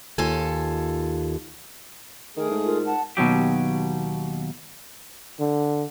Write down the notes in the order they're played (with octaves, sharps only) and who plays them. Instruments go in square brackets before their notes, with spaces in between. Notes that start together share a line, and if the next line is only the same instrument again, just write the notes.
[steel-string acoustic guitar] D#2 F4 A4 G#5
[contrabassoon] D#3 [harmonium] A3 G#4 [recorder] A#4
[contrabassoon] G#2
[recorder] F4 [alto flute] A#4
[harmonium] F#5 [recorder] A5
[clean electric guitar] D#2 B2 D#3 F#3 G4
[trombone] D3